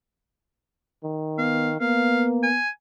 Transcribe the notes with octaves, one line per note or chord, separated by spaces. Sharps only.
D#3
B3 F5
A#3 B3 F5
G#5